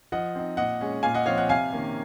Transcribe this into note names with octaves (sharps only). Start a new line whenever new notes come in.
F3 D#5 F#5
C4 D#4
A#2 D#5 F#5
G#3 C#4
A#2 F5 G#5
D#5 F#5
F3 C4 C#5 F5
D#5 F#5
C3 F5 G#5
D#3 A#3 C#4